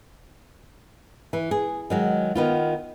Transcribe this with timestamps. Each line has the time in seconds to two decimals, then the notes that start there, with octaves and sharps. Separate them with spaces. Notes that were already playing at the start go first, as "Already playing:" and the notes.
1.33 E3
1.51 G#4
1.90 D#3 F#3 G#3
2.35 D#3 B3 F4